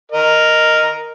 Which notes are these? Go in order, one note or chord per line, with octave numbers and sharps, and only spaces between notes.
A#4 D#5